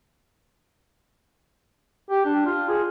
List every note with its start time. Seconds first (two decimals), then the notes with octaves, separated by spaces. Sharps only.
2.10 G4
2.25 D4
2.46 F4
2.69 G#4